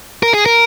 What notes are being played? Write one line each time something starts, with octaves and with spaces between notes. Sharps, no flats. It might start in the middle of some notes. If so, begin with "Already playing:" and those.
A#4
G#4
A#4